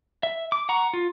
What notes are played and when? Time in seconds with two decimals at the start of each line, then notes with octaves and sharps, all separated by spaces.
0.23 E5
0.52 D6
0.69 F#5 A#5 C#6
0.93 F4